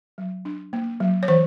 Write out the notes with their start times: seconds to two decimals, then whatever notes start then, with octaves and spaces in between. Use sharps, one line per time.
0.18 F#3
0.45 D4
0.73 A#3
1.00 F#3
1.23 C#5
1.28 E3 C5